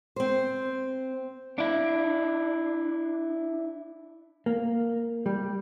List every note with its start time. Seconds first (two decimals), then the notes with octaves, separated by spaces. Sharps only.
0.16 C4 C5
1.58 D4 E4
4.46 A#3
5.26 G3